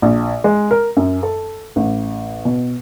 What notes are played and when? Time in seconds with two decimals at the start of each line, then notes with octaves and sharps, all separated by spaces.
0.02 A#1
0.44 G#3
0.71 A#4
0.97 F#2
1.23 A4
1.76 A1
2.45 B2